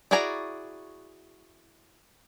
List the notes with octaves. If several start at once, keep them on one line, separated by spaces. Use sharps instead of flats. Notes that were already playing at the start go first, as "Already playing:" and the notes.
E4 F#4 G#4 D5 A#5